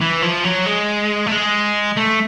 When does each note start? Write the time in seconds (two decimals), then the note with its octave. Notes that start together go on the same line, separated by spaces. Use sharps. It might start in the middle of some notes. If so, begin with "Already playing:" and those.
0.01 E3
0.22 F3
0.45 F#3
0.67 G#3
1.27 A3
1.32 G#3
1.97 A3